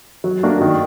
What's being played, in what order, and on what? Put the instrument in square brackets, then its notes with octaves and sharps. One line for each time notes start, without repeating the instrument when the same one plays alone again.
[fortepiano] F#3
A#3 D4 F#4
D#3